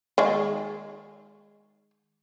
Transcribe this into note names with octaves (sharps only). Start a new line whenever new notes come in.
D#3 G#3